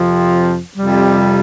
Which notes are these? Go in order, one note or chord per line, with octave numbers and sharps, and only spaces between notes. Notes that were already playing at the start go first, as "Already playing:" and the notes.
Already playing: F2 C3 F3
F2 C3 G3